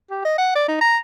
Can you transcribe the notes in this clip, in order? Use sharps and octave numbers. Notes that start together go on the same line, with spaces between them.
G4
D#5
F#5
D5
D#4
A#5